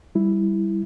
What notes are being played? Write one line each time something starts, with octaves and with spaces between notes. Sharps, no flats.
G3 E4